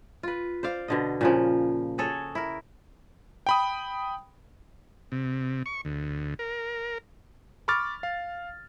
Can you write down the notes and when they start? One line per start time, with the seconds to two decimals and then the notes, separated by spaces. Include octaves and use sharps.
0.23 F4 B4
0.63 C5 D5 F5
0.88 B2 D3 D#5
1.21 A#2 C#3 F3
1.98 F#4 G#4 A4 C#5
2.35 E4 A#4
3.47 G5 B5 D#6
5.12 C3
5.66 C#6
5.85 D2
6.39 A#4
7.68 B5 C#6 D6 F6 A6
8.03 F5